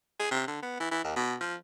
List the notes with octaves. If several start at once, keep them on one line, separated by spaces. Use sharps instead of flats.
G#4
C3
D3
B3
E3
E3
D#2
B2
F3